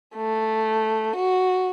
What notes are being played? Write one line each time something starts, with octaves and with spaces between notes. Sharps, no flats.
A3
F#4